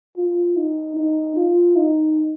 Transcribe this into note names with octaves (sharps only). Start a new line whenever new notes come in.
F4
D#4
D#4
F4
D#4